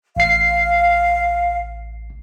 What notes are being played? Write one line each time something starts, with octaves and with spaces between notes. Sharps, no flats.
A1 F5 C7